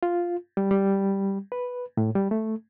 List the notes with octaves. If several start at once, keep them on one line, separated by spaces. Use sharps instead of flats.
F4
G3
G3
B4
A2
G3
A3